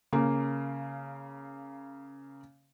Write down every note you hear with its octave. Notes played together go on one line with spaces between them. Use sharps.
C#3 A#3